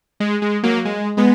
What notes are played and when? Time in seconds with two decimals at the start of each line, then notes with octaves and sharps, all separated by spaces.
0.20 G#3
0.42 G#3
0.63 F#3 A#3
0.85 G#3
1.17 G#3 B3